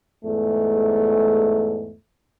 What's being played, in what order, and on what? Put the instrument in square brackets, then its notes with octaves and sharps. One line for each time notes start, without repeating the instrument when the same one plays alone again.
[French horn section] E2 G#2 A3